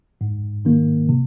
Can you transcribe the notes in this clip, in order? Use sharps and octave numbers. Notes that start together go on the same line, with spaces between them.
G#2
D#3 A#3
C3